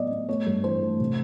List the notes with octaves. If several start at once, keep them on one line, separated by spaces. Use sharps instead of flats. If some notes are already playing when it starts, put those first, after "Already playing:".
Already playing: A2 F#3 B3 D5 D#5
B3
A3 C#5
G2
E3 C5
A3
C3